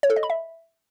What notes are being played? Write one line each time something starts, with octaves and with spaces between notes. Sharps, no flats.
C#5
A4
D#5
B5
E5